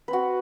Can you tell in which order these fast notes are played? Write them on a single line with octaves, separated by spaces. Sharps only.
B4 C4 F#4